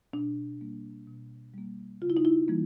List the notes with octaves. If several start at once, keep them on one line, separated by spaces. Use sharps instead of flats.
B2 D4
G3 A#3
B2
G3 A#3
C#3 F4
E4
D#4
E4
E3 G3 A#3